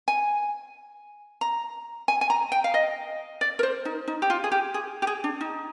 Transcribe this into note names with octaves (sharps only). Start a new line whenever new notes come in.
G#5
A#5
G#5
G#5
A#5
G5
F5
D#5
D5
A#4
C5
D#4
D#4
G4
F4
G#4
G4
G#4
G4
G#4
D4
D#4